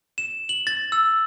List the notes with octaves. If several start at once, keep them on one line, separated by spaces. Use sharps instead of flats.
E7
F#7
A6
E6